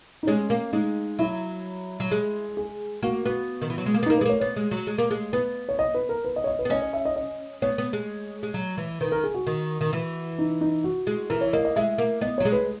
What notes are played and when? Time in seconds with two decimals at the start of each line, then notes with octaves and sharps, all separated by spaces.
0.23 D#4
0.27 G#3 C#4
0.50 A#3
0.73 G#3 D#4
1.19 F#3 E4
2.00 F#3
2.11 G#3
2.57 G#4
3.03 A#3 F#4
3.25 B3 F#4
3.62 D#3
3.70 E3
3.78 F#3
3.86 G#3
3.94 A#3
4.03 B3
4.06 A#3 D#4
4.18 G#3 B4
4.25 A#3 C#5
4.40 B3 C#5
4.56 G#3
4.71 F#3
4.87 G#3
4.98 A#3
5.11 G#3
5.33 B3 B4
5.69 C#5
5.79 D#5
5.94 B4
6.09 A#4
6.24 B4
6.36 D#5
6.44 C#5
6.47 D#5
6.59 B4
6.65 B3
6.70 C#4 D#5
6.82 D#5
6.93 E5
7.05 D#5
7.16 D#5
7.62 B3 C#5
7.78 B3
7.93 G#3
8.43 G#3
8.54 F#3
8.78 E3
9.01 D#3 B4
9.12 A#4
9.24 G#4
9.34 F#4
9.47 D#3
9.81 D#3
9.93 E3
10.39 D#4
10.61 D#4
10.84 F#4
11.07 G#3
11.30 E3 A#4
11.41 C#5
11.53 A#3 D#5
11.65 D#5
11.76 G#3 E5
11.98 A#3
12.21 B3 D#5
12.38 F#3 C#5
12.45 G#3
12.52 B4